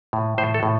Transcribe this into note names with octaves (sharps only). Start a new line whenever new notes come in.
A2
A2 C5
A4
A2